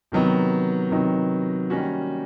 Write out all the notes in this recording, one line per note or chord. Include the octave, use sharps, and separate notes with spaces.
C3 D#3 F#3 B3 D#4
C3 D#3 F#3 B3 D#4
D#3 G3 A#3 C#4 F#4